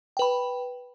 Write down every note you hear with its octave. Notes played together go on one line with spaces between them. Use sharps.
B4 G5 B5